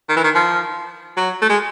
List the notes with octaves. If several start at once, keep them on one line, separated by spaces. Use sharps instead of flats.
D#3
E3
D#3
F3
F#3
A3
G#3